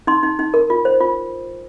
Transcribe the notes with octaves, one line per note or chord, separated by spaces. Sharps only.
D#4 C6
D#4
D#4
A#4
F4
C5
F4